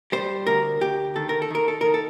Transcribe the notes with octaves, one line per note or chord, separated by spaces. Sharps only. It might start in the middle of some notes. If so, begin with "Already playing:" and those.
G3 C5
D2 A#4
D2 G4
D#3 A4
A#4
A4
D#3 A#4
A4
D#3 A#4
A4